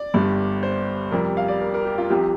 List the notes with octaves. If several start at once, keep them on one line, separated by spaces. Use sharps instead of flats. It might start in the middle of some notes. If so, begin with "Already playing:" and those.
Already playing: D5
G1 G2 G3
C5
F2 C3 G3 A#4
F5
D5
A#4
A#4
G4
F4
C2 C3 F3 G4